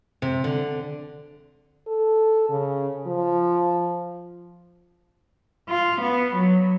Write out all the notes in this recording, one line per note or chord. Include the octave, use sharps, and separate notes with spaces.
C3
D3
A4
C#3
F3
F4
B3
F#3